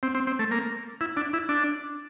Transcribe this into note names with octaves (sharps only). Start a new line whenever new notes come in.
C4
C4
C4
A3
A#3
E4
D4
E4
D4